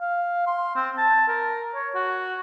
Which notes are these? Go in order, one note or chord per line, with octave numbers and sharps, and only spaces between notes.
F5
C6
C4
A5
A#4
C#5
F#4